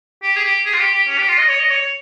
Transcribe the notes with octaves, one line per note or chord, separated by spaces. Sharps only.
G4
G#4
G4
G#4
F4
G4
G4
C#4
G4
F4
D#5
C#5
D#5
C#5
C#5